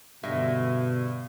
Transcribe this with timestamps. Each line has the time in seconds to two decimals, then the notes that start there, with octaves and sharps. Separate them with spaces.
0.23 G2 B2 D3 D#5 E5